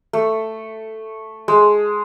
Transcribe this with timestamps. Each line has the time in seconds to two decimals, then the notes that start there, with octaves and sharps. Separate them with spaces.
0.13 A3
1.48 G#3